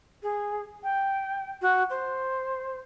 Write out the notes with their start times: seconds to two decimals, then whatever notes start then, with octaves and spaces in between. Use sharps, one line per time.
0.23 G#4
0.83 G5
1.62 F#4
1.90 C5